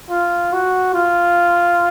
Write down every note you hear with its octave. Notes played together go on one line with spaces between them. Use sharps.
F4
F#4
F4